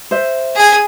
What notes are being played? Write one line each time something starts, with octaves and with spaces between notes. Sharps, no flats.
C5 E5
G#4 G#5